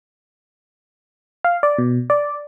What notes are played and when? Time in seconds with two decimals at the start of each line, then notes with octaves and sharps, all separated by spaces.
1.44 F5
1.63 D5
1.78 B2
2.10 D5